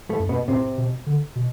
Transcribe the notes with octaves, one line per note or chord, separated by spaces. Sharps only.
A2 A3
F#2
B2 B3
A2 C3 C4
B2
D3
B2